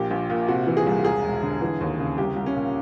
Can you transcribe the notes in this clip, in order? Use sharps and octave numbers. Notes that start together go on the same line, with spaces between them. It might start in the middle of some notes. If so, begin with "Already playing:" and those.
Already playing: A#1 A#2 G4
A#1
A#2
C3 F#4
E3
G#4
C2
E1 G#4
E1
D3
E3
D#2
C#3
C2 G4
C2
C#4
A#2